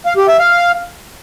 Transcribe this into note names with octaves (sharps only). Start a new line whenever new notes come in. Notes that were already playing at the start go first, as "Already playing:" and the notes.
F5
G4
E5
F5